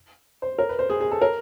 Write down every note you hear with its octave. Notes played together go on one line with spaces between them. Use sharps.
C5
A#4
B4
C5
G#4
G#4
A4
A#4